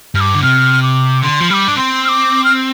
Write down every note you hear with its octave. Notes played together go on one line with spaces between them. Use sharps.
G2 F6
D6
D3
C3 F6
D6
D3 C6
F3
G3 D6 F6
D4
C4 C6
F6
D6
F6